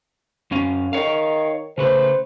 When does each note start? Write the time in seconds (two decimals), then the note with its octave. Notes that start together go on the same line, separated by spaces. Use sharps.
0.51 F#2 C#4 F5
0.93 D#3 C#5 F5
1.78 C#3 A3 B4 C5